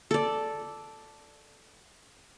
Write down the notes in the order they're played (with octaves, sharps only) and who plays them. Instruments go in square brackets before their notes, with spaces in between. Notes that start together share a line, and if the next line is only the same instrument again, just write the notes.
[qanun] A4 D5